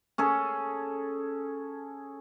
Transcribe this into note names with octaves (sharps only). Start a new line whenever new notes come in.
C#4 G#4 A4